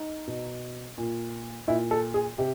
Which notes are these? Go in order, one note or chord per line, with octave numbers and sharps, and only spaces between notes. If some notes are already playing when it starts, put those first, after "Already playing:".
Already playing: D#4
B2
A#2
A#2 E4
A4
G#4
C3 G4